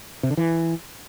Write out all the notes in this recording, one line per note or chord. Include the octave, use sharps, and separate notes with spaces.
C3
D3
E3